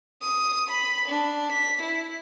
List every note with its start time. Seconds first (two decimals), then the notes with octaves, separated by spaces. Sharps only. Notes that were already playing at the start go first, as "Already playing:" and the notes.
0.21 D#6
0.69 B5
1.08 D4
1.52 B6
1.82 E4